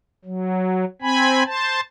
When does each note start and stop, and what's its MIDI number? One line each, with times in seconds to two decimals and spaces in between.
0.25 0.84 54
1.02 1.43 60
1.02 1.43 80
1.02 1.43 83
1.46 1.80 72
1.46 1.80 81